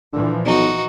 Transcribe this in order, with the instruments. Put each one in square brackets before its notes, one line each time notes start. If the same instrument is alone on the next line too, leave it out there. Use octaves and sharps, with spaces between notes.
[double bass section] A#2 E3 F3 [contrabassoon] D3
[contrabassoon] B1 [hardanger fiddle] D#4 F#4